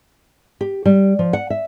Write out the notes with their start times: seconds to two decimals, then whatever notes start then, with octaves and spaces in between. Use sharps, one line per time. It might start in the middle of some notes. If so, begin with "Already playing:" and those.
0.61 G4
0.86 G3
1.19 F3
1.33 F#5
1.50 E5